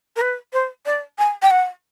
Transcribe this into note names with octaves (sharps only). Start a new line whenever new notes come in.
A#4
B4
C5
D5
G#5
G5
F#5